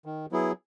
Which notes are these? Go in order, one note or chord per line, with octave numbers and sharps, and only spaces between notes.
D#3
F#3 B3 E4 G#4